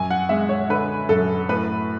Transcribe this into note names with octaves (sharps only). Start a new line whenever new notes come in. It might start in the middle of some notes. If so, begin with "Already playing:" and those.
Already playing: F#2 G#5
F#5
G#3 E5
C#5
D3 B4
F#2 A4
A2 B4